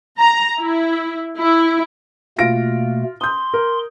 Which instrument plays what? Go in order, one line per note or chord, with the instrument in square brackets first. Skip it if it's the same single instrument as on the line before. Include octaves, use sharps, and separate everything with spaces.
[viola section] A#5
E4
E4
[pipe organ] B2 A3 A#3 [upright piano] F4 A#6 D7
[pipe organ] C6 [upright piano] D#6 G6
[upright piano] A#4